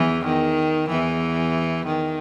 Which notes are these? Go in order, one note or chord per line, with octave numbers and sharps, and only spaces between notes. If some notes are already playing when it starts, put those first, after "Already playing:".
Already playing: E2 E3
D#3
E2 E3
D#3